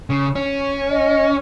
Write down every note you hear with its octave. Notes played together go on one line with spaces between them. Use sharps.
C#3
C#4
D#5